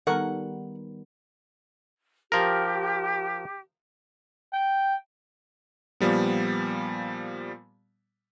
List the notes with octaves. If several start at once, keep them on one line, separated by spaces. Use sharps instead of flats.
D#3 G3 B3 A4 A#4 F#5 C#6
F3 G4 A#4
G5
A#2 F3 G3 B3